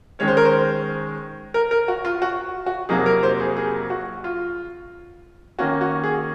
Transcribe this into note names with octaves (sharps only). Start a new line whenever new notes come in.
D#3 G#3 C#4 C#5
C5
A#4
C5
A#4
A#4
F#4
F4
F#4
F#4
F2 C3 F#3 A#3 D#4 G#4
A#4
C5
G#4
G#4
F#4
F4
D#3 A#3 C#4 F#4
F#4
G#4